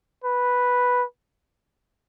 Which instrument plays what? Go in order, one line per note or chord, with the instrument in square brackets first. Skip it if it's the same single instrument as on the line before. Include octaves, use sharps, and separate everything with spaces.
[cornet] B4